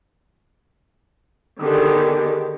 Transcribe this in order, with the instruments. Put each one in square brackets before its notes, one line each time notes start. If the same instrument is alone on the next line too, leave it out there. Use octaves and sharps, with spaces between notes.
[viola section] D3 D#3 B3 G4 G#4